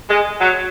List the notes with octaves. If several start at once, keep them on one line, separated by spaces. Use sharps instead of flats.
G#3
F#3